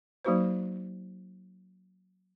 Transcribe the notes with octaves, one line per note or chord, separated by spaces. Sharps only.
F#3 A#3 D#4 F#4 B4 C5